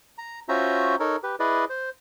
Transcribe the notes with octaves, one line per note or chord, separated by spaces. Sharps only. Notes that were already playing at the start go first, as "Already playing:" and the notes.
A#5
C#4 F4 F#4 C5 E5 A#5
D#4 A4 A#4 C#5
G4 B4
E4 G#4 B4 D5 D#5
C5